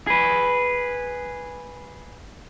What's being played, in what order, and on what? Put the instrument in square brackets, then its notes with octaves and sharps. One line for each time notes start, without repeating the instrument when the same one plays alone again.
[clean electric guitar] G#4 B4